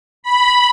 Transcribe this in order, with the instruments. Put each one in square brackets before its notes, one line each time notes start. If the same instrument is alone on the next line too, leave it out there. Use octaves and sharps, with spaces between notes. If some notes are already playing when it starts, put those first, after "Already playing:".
[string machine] B5